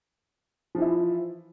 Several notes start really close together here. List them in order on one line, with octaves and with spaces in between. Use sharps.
F3 E3 E4